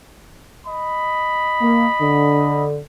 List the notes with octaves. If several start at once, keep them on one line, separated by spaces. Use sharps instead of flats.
D#5 B5
A#3
D3